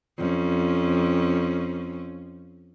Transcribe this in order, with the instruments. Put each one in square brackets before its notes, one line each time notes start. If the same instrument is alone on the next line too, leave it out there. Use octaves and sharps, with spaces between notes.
[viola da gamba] F2 C#4